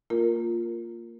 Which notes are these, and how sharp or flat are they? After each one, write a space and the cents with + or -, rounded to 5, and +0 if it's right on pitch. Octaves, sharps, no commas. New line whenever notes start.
A#3 -15 F4 +0 A#4 +0